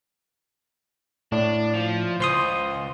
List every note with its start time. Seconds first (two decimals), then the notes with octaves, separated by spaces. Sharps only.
1.32 A2 D4
1.73 F3
2.20 C#2 C5 C6 D#6